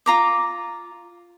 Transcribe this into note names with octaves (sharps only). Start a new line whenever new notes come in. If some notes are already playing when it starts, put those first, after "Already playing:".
F4 A#5 D6